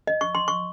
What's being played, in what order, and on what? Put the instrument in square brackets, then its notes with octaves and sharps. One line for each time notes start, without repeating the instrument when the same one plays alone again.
[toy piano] D#5
C#6
C6
C#6